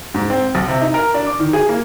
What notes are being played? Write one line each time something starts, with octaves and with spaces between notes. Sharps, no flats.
G#2
C4
B1
C3
D#4
A#4
D4
D6
D#3
G#4
A#3